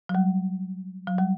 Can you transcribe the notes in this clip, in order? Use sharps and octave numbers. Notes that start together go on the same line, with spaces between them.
F#3
G3
F#3
G3